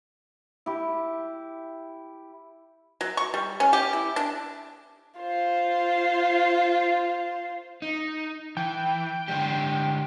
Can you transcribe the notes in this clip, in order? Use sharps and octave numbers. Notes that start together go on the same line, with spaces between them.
E4 G4
F#3
C#6
G3
C#4
G4
E4
D4
F4 C5
D#4
E3 G5
D3 G#3 G4